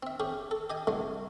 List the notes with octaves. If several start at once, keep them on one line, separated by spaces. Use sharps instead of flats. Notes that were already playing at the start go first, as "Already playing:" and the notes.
C4 E5
C#4 G4 G#4
A4
G4 D#5 G#5
C2 F#3 G#3 A3